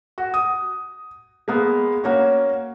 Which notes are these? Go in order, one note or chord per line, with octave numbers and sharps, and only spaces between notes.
F#4
D#6
G#3 A#3 B3
A#3 C#4 F#4